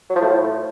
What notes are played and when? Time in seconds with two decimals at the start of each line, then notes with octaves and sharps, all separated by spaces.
0.10 F#3
0.16 F3
0.22 A2